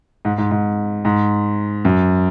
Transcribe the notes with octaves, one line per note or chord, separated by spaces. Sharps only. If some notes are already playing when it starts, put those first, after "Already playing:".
G#2
G#2
G#2
G#2
F#2